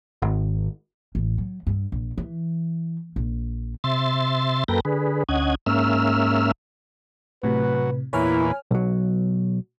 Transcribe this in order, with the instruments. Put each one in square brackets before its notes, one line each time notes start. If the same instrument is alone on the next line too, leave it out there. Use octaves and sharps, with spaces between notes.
[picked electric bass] G#1
[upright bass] A1
F#3
G2
A#1
E3
A#1
[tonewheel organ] C3 E5 C6 A6
F#2 A#3 A4 B4 G5 A#6
D3 G#4 B4
D2 C#4 D#5 F#5 G#6
G#2 A#3 C#4 E5 E6 F6
[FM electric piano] A2 C3 [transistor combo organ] F#3 [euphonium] B4
[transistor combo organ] E2 A#2 B4 [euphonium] E4 [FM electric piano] C#5 G#5 F6
[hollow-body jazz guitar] B1 F#3